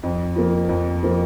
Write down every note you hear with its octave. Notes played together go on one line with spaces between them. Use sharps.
F2
F3 A#3
F2
F3 A#3